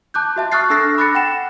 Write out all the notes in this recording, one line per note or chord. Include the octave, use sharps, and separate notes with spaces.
A5 D6 F#6 G6
F#4 E5 A5
C#6 D#6 F6 F#6 A6 C7
D4 A4 E6 F#6 A#6 C7
B5 D6 F#6 A6 A#6 C#7
F#5 G5 E7